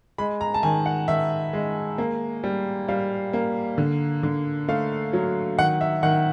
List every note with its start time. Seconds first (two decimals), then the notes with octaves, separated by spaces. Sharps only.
0.18 G#3 B5
0.41 A#5
0.54 A5
0.63 D#3 G#5
0.86 F#5
1.08 D#3 E5
1.53 G#3
1.98 A#3
2.44 G3
2.88 G3 F5
3.33 A#3
3.78 D3
4.23 D3
4.68 A3 F5
5.13 F#3
5.58 D#3 F#5
5.81 E5
6.03 D#3 F#5